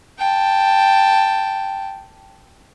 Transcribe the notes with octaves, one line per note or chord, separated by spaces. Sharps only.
G5 A5